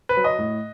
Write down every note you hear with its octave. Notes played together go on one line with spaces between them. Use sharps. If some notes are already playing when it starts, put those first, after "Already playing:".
B4
F#3
D#5
A2